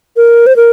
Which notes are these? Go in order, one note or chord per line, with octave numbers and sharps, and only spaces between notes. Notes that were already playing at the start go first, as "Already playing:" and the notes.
A#4
C5
A#4